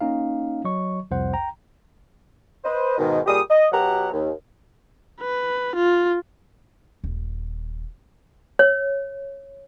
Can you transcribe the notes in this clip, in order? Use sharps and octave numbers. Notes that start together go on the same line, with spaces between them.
A#3 C#4 D#4 F5
F#3 C#5 D#5 C#6
C2 F2 C5 F#5
G5 A#5
B4 C5 D#5
G#2 B2 D#3
A#2 G3 G4 G#4 D#6
D#5
B2 F#3 G4 F#5 A#5
D#2
B4
F4
D#1
C#5